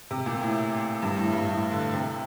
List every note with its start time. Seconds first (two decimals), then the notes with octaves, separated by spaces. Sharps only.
0.11 C3
0.26 A#2
0.41 A2
1.02 G2
1.17 A2
1.32 G2
1.48 A2
1.71 D3
1.94 C3